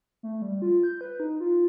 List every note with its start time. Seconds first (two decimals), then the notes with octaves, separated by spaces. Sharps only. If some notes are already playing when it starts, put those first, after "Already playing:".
0.23 A3
0.42 G3
0.62 F4
0.83 G6
1.01 B4
1.20 D#4
1.40 F4